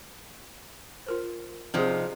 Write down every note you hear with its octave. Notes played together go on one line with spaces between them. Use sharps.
F4 A#4 C5
C3 F3 C4 D4 D#4 G#4 C5